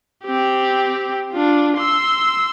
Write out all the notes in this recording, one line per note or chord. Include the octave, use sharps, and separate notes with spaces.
C4 G4
D4 F4
C6 E6